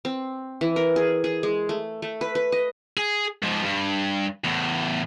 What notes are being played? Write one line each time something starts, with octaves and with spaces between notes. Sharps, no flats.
C4
E3
A#4
G#4
G#4
G#3
A3
A3
B4
B4
D#5
G#4
G#2 F3
G2
E2 A2